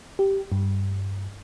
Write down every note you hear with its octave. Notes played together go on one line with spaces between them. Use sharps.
G4
G2